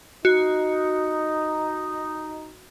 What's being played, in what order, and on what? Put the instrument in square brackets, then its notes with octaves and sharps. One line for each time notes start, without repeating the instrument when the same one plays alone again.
[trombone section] D#4 [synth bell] F#4